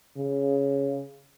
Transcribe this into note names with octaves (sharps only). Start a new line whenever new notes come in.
C#3